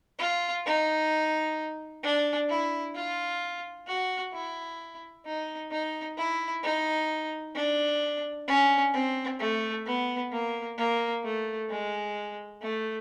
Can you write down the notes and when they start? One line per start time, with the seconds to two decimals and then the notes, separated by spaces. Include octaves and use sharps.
0.19 F4
0.65 D#4
2.03 D4
2.49 E4
2.95 F4
3.87 F#4
4.33 E4
5.26 D#4
5.71 D#4
6.18 E4
6.63 D#4
7.56 D4
8.48 C#4
8.94 C4
9.40 A3
9.86 B3
10.32 A#3
10.78 A#3
11.24 A3
11.70 G#3
12.62 A3